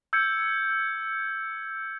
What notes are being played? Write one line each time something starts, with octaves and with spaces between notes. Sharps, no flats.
E6 G6 G#6 C#7